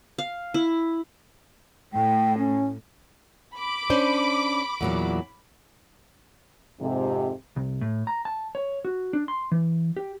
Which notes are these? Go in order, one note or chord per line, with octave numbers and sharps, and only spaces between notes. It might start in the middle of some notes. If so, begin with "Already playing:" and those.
F5
E4
A2 G5
C#4
B5 D6
C#4 D4 C5
E2 A#2 F#3
F2 G#2 C3
C2
A2
A#5
A5
C#5
F#4
D4
C6
E3
G4